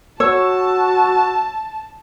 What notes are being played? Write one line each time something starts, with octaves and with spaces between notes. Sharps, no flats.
F#4 C#5 A5 E6